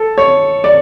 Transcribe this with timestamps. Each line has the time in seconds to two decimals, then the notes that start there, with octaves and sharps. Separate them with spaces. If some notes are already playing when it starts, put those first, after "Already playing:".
Already playing: A4
0.18 C#5
0.64 D5